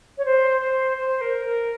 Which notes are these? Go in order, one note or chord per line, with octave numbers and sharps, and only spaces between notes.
C#5
C5
C5
C5
A#4
A#4